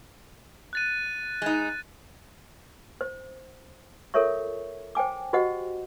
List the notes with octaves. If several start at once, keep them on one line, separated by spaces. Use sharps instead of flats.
F#6 A6 D#7
G#3 D#4
C5
F4 A4 A#4 C#5 E5 C#6
C5 G5 G#5 D6
F#4 G4 C5 D#5 F#5